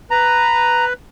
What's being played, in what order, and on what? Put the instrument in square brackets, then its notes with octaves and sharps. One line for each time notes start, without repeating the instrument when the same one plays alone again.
[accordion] B4 [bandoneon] A#5